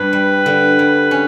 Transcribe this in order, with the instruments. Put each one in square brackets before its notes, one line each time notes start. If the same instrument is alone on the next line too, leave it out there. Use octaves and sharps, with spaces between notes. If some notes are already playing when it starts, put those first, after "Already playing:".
Already playing: [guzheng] G2 [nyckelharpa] B4
[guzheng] G3
D3
G2
C#4